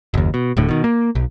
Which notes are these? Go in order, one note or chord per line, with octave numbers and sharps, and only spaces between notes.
F#1 D#2
B2
D1 A2 D3
B2 D#3
A#3
B1